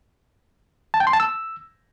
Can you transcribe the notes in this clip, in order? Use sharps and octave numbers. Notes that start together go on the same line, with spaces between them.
A5
G5
C6
A5
E6